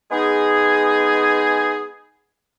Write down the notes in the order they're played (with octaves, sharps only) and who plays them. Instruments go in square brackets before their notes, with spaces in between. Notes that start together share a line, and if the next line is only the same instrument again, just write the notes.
[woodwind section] G#3 B3 D#4 G#4